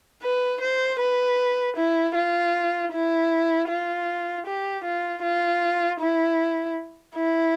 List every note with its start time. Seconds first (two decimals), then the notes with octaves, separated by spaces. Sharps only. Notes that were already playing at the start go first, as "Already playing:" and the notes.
0.23 B4
0.61 C5
1.00 B4
1.76 E4
2.16 F4
2.92 E4
3.69 F4
4.46 G4
4.84 F4
5.23 F4
6.00 E4
7.16 E4